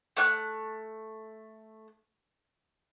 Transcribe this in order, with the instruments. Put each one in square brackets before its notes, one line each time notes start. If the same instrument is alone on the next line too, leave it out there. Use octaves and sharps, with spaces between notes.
[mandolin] A3 F#5 F#6